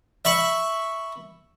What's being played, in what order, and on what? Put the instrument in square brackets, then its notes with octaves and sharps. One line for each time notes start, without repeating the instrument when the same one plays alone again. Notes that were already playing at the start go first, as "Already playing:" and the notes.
[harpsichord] E5 B5 C#6